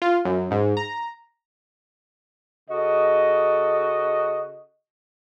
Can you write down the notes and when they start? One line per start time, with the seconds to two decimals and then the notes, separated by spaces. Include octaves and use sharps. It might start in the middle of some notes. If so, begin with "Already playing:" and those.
0.02 F4
0.25 F#2
0.51 G#2
0.77 A#5
2.70 C#3 F#4 A4 D#5